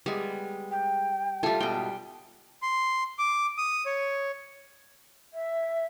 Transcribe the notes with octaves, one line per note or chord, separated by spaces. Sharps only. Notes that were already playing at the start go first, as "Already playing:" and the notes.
G3 G#3 B3
G5
G3 A3 F4 A4
G#2 B2 G5
C6
D6
D#6
C#5
E5